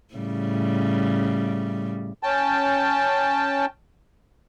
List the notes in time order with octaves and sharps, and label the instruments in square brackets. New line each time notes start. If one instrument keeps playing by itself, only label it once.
[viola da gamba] A2 C#3 G3
[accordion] C#4 G5 A5